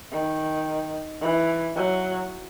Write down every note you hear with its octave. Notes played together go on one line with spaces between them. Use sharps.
D#3
E3
F#3